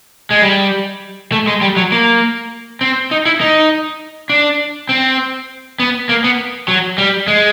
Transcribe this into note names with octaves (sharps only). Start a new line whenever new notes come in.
G#3
G3
A3
G#3
G3
F#3
A#3
C4
D#4
E4
D#4
D4
C4
B3
A#3
B3
F#3
G3
G#3